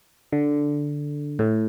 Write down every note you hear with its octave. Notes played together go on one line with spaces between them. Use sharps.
D3
A2